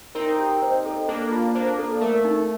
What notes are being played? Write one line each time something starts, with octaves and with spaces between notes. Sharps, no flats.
C4 D#4 A#4
G4
C5
A4
A#3 D4 A4
F4
A#3 D4 C5
A4
A3 A#4
D#4